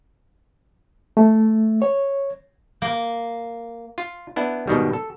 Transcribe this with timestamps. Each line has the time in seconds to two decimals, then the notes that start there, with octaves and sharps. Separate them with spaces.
1.17 A3
1.82 C#5
2.82 A#3
3.98 F4
4.36 B3 D4 E4
4.68 G#2 B2 D#3 G3
4.93 A4